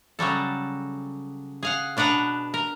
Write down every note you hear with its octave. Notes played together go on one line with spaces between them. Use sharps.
C#3 F#3 G3 A4
G#4 F5 F#5
B2 D4 B4 F#5 A#5
A#4